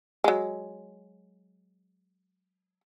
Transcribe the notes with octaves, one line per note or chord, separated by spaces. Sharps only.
F#3 G#3